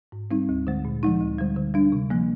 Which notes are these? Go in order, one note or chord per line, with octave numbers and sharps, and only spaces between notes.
G#2
G3 C4 D#4
D2
D3 G#3
A#2
F3 G#3 D#4
D2
D3 G3
D3
G3 D4
C3
F3 A#3